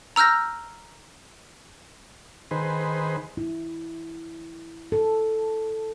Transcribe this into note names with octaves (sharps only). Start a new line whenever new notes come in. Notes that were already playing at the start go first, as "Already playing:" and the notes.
A#5 E6 F6 G6 A#6
D#3 G#4 B4 C5
E4
A4